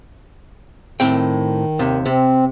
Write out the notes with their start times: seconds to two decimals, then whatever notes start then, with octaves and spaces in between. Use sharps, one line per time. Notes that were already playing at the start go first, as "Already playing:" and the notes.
1.00 A2 D#3 C4 G5
1.79 D#2 C3
2.06 C3 C4